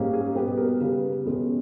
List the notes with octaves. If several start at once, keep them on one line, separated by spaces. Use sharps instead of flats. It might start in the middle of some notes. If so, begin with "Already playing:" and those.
Already playing: G#2 G3 A#3 C#4
G#4
B2 G3 B3 G4
A#4
C#3 G3 B3 B4
E2 B2 G#3 C#4